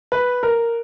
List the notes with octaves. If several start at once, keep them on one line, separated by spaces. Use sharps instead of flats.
B4
A#4